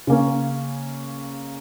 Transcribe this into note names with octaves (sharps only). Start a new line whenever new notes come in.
C#3 A#3 C#4